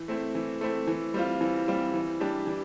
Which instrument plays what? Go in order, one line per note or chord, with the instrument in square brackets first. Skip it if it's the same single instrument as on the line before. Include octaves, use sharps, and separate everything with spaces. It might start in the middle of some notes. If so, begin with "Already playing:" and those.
Already playing: [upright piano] E3
A3 C4 E4
E3
A3 C4 E4
E3
G3 C4 F4
E3
G3 C4 F4
E3
G3 D4 G4
E3